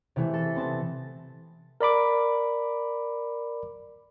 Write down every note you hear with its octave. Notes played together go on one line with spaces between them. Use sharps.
C3 E3 A3
A4
B3 C4 A5
A#4 D5 B5 D6